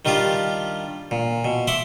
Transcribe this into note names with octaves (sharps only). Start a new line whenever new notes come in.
D#3 G3 D4 F4 G4
A#2
B2
E5 F#5 C6 D6